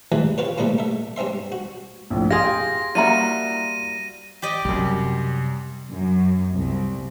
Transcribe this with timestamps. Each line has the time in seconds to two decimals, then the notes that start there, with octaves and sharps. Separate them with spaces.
0.12 A1 E2 E3 G#3 B5
0.38 C4 F4 B4 C#5
0.58 A2 C#3 G3 A#3 C4
0.78 A3 E5
1.16 G2 C4 C#4 E5 C6
1.52 F#4
2.10 A#1 A2
2.30 G4 G#4 F5 C6 D#6 A#6
2.95 G3 A#3 E4 F#4 E5 A#5 D#7
4.42 G4 D5 D#5
4.65 F#2 C3 G3
5.91 F#2
6.54 C2